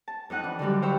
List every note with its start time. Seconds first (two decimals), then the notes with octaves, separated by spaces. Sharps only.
0.08 A5
0.30 F2 D#4 D#5 F#5 F#6
0.43 E3 D4
0.59 D3 D#3 F#3 G3
0.82 C5 F5 G5 B5 C#6 E6